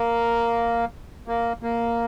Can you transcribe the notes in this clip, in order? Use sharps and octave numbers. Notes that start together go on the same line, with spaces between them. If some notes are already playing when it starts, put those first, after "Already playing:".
Already playing: A#3
A#3
A#3